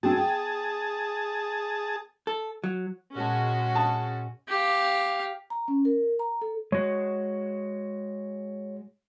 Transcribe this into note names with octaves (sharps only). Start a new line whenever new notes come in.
C4 D4 F#4 G#4 A5
G5
A4
F#3
A#2 G#3 C#4 F#4 A5
A5 D#6
G4 F5
A#5
C#4
A#4
A#5
A4
G#3 F#4 C#5